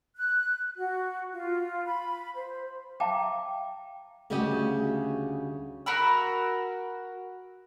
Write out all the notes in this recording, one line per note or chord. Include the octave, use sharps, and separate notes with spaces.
F#6
F#4
F4
B5
C5
E5 F5 G5 A5 A#5 D6
D2 C#3 G3 F#4 G4 D#5
F#4 A#4 B5 E6